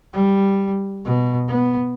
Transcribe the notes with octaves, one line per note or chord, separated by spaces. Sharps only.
G3
B2
B3